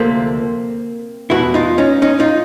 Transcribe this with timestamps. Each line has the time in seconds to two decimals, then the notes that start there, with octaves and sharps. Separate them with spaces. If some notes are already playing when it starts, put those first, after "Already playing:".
Already playing: D2 C3 F3 A3 A#3 C4
1.30 E2 B2 G3 E4 F#4
1.54 D#4 F4
1.78 C#4 D#4
2.02 C#4 D#4
2.20 D#4 F4